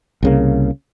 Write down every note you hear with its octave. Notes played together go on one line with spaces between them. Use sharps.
C2 C#3 A#3